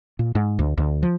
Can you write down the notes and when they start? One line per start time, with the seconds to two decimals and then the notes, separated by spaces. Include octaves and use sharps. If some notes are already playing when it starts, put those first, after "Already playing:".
0.19 A#2
0.35 G#2
0.59 D2
0.78 D2
1.03 F3